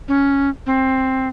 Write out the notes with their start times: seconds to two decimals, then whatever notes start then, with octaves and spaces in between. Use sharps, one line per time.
0.08 C#4
0.66 C4